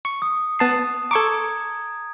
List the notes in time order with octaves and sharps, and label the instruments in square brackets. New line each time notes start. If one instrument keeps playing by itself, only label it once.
[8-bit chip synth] C#6
[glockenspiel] D#6
[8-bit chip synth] B3 A5 C7
[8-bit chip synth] A4 C#6 D6 [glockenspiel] A#5 G#6